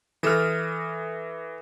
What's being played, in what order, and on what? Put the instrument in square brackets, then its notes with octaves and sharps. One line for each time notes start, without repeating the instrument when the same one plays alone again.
[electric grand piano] E3 F6 [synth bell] A4 D#6 A#6